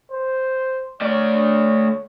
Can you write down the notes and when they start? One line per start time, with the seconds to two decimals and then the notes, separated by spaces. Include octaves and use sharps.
0.12 C5
1.02 A3 C#5 D5